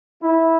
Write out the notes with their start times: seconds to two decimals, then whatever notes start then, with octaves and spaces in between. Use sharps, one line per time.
0.21 E4